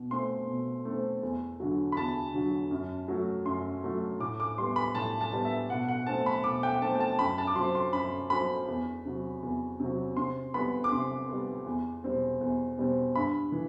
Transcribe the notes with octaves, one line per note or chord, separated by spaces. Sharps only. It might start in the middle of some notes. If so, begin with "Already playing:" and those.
Already playing: B2
A3 C4 C6
B2
A3 C4
E2
D3 F#3
B5
E2 A5
D3 F#3
F#2
F#3 A3
F#2 C6
F#3 A3
A2 D6
D6
G3 B3 C6
B5
A2 A5
A5
G3 B3
E5
B2 F#5
F#5
A3 C4 A5
B5
B2 D6
G5
G5
A3 C4 A5
G5
A5
F#2 B5
A5
D6
F#3 C4 C6
C6
F#2 B5
F#3 C4 B5
E2
C3 F#3
E2
C3 F#3
C3 C6
G3 B3 B5
D6
C3 C6
G3 B3
E2
B2 G3 C4
E2
B2 G3 C4
G2 B5
E3